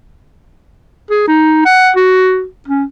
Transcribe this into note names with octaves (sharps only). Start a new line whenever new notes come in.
G#4
D#4
F#5
F#4
C#4